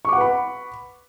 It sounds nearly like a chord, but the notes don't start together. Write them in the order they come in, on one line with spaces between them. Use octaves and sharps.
C#6 D6 F#5 B4 B5